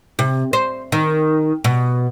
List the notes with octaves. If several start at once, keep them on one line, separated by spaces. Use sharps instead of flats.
C3
C5
D#3
B2